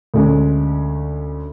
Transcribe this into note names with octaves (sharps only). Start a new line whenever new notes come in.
D2 D3 G#3 C#4